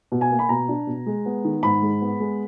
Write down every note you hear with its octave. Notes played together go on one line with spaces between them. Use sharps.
B2
G#5
A#3
B5
B2 A#5
D4
B2
G#3
B3
D#3
G#2 B5
G#3
B3
G#3